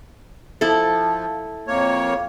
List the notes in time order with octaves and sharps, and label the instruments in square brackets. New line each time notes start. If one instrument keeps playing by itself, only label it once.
[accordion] F3 [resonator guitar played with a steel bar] E4 A4
[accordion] F2 A#3 C#5